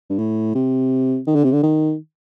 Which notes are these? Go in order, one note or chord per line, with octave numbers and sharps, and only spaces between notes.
G2
A2
C3
D#3
D3
C3
D3
D#3